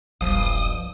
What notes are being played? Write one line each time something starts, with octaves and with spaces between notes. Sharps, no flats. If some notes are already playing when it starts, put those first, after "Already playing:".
E1 B1 G2 F3 F5 D#6